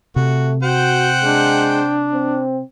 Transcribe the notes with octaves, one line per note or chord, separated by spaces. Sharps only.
C3 A3 F#4
F#4 C5 F#5 G5
G#3 D4
C4